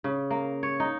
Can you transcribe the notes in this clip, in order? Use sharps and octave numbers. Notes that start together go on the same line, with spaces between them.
C#3
A#3
C#5
D#4